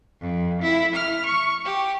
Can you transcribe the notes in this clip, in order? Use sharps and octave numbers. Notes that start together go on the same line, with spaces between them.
F2
E4
F6
C#6
G4